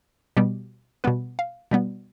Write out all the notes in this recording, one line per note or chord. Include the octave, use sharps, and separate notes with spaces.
B2 G3 B3 G4
B2 G3 B3 B4
F5
B2 G3 B3